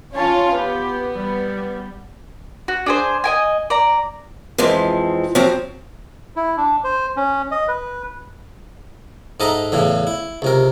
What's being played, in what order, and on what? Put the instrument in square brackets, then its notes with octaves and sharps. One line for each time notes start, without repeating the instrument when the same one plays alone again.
[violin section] C#4 F4 [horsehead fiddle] C#5 A5
[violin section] B3 [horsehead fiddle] G4
[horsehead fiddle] G3
[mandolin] F#4
D4 G#4 C5
D#5 G5 G#5
D5 A#5
[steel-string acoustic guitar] F2 E3 F3 G#3
F3 F#3 C4
[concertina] E4
D4
C5
C#4
D#5
B4
[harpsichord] G#2 A4 D#5 E5 A#5
E2 A2 C#3 E3
E4
C#2 C3 A#4